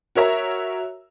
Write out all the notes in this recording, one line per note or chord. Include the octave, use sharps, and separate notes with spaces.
F#4 A#4 C#5 E5 A#5